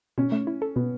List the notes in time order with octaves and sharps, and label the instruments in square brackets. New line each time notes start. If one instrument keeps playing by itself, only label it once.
[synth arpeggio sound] B2 [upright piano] C#4
[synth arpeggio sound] A3
E4
A4
[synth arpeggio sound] B2 [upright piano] B3